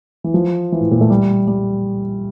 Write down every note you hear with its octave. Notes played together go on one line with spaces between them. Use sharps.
E3
F3
E3
A2
A#2
A3
G3
G3